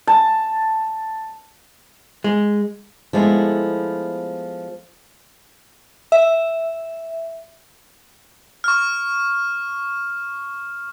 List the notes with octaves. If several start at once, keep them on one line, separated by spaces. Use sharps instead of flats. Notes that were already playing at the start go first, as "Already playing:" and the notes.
A5
G#3
F3 G#3 A3 B3 E4
E5
C#6 F6